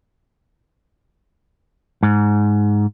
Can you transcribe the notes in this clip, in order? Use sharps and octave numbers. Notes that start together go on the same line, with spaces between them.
G#2